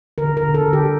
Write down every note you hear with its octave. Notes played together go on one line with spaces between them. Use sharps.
D3 A#4
A#4
D3
A4
D3
G4